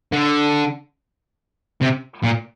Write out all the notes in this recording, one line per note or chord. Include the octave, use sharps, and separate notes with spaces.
D3
C3
A#2